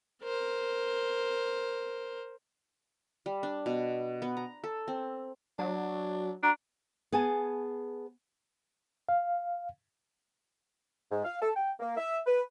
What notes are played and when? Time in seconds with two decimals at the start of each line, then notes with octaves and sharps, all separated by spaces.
0.22 A#4 C5
3.26 G3
3.43 D4
3.66 B2
4.22 B3
4.37 A#5
4.64 A4
4.88 C4
5.59 F#3 D4
6.43 D4 F#4 A#5
7.12 B3 G#4 G#5 A5
9.09 F5
11.12 G#2
11.25 F5
11.42 A4
11.56 G5
11.80 A#3
11.97 E5
12.27 B4